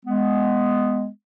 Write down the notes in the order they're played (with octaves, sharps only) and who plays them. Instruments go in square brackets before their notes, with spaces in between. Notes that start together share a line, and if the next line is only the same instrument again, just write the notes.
[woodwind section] G#3 B3